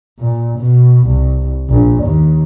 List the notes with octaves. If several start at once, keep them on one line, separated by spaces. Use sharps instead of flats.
A#2
B2
C2
A#1
D#2